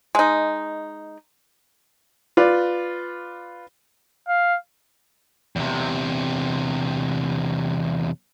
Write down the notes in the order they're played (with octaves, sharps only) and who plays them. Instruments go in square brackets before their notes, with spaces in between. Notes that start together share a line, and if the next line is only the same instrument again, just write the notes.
[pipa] G#3 D#4
[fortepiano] F4 B4 D5
[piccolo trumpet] F5
[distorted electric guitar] E2 C3